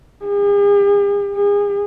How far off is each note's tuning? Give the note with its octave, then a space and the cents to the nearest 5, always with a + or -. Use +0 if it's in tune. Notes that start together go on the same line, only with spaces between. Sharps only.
G#4 -45
G#4 -35